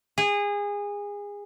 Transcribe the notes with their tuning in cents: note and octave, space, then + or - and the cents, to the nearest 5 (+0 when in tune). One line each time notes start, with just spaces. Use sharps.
G#4 -25